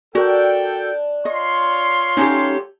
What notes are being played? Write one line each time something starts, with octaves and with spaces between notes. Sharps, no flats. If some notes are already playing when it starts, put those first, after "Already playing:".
D4 F#4 A4 A#4 G5
F4 C#5 D#5 C6
F#3 A3 C#4 D#4 G4